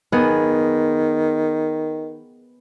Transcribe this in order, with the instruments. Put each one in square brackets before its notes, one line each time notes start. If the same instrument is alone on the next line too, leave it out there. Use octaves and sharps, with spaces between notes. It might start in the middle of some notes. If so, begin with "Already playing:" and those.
[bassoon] D#3 [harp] B3 G#4